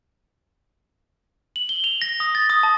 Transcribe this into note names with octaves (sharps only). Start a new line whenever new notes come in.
F#7
G7
F7
A#6
D#6
A6
D#6
A5